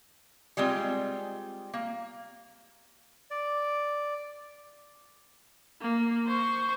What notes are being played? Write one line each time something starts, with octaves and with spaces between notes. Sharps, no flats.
G3 G#3 C4 F4
A#3
D5
A#3
C5 C#6